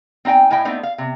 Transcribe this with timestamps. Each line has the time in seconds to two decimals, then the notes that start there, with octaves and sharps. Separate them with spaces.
0.25 C4 D#4 D#5 G5 G#5
0.51 A2 E4 D#5 G5 G#5
0.65 A3 B3 C4 D4 D#4
0.83 F5
0.98 C3